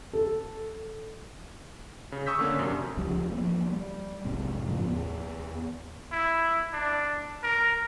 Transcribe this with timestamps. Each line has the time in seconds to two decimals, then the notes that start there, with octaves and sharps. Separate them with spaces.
0.13 A4
2.12 C#3
2.26 C#6 D#6 E6 G6 B6
2.39 D3 A#3 C#4
2.59 F#2 C3 D4
2.97 C#2 C#3 F3 G3
3.30 F3 A#3 B3
3.72 G3
4.25 F1 B1 G#2 C3
4.66 F#2 A2 C#3 F3
4.86 D#2 B3
6.12 E4
6.73 D4
7.43 A#4